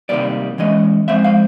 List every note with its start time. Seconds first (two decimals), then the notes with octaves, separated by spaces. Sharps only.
0.09 C3 D#3 G3 A#3 D5
0.58 E3 G#3 C#4 D#5
1.08 F3 G#3 C4 E5
1.24 F5